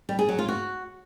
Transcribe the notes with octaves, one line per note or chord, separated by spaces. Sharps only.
G3
G#4
F#3
F4
F#4